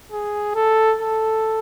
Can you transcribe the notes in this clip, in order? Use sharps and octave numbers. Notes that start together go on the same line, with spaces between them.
G#4
A4
A4